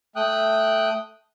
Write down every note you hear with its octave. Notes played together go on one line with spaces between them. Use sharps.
A3 G5 D#6 F#6